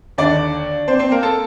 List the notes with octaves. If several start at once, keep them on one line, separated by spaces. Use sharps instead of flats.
D#2 D3 D4 D5
C4 C5
C4 C5
A#3 A#4
A4 A5